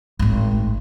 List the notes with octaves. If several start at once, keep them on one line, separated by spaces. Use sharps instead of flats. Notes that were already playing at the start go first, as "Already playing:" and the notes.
G#1 A2